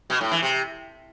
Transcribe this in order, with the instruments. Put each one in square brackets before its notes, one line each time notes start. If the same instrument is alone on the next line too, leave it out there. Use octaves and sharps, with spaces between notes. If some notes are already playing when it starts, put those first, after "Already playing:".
[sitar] B2
A2
E3
C3